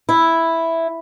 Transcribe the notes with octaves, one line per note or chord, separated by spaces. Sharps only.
E4